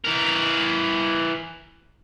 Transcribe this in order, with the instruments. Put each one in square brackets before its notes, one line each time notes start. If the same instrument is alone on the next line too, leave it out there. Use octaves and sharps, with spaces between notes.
[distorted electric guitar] E3 A#4